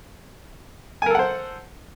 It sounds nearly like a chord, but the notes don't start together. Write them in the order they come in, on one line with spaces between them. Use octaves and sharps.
G#5 A#4 A4 F#5 C5